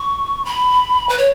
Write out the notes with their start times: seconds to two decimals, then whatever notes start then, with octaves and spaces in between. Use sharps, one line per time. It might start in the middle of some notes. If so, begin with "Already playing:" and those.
Already playing: C#6
0.45 B5
1.09 B4
1.18 C#5